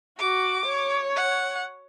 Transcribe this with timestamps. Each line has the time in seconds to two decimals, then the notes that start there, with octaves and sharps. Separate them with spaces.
0.19 F#4 D6
0.66 C#5
1.16 F#5